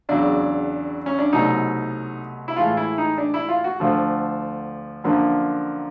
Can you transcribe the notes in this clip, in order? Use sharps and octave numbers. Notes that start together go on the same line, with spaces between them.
E2 C#3 F#3 D4
C#4
D4
C2 B2 F#3 A3 D#4
E4
A2 E3 G#3 F4
E4
D#4
D4
E4
F4
F#4
D2 D3 F3 A3
F#2 D3 F3 A#3